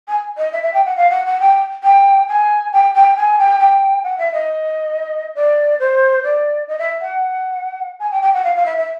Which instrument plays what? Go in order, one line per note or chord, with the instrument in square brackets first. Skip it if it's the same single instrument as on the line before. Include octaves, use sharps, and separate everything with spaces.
[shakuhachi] G#5
D#5
E5
E5
G5
F#5
F5
F#5
F#5
G5
G5
G#5
G5
G5
G#5
G5
G5
F#5
E5
D#5
D5
C5
D5
D#5
E5
F#5
G#5
G5
G5
F#5
F5
F5
E5
E5